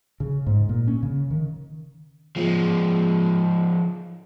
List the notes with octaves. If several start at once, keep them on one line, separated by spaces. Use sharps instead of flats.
C#3
G#2
A#2
C#4
C#3
D#3
F3 G#3